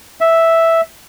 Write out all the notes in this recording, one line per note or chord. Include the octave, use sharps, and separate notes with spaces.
E5